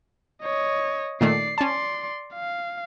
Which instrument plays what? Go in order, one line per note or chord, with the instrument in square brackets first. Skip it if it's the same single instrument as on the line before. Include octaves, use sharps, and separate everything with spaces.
[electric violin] C#5 D#5
[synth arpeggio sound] A#2 D#3 A3 [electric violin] D5 C7
[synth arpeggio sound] C#4 A5 [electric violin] D5 C6
[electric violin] F5